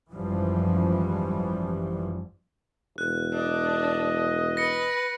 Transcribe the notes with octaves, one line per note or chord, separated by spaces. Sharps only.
G#1 F#2 E3 F3 G3
E1 F#6
D4 D#5
B4 A#6 C#7